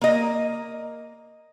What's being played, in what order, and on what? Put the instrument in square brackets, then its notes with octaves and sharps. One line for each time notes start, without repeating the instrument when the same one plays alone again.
[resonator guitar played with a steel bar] A#3 D#5